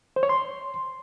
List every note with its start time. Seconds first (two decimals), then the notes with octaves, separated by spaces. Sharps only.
0.16 C5
0.23 C#5
0.29 C6